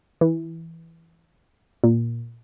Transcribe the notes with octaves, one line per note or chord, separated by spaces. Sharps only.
E3
A#2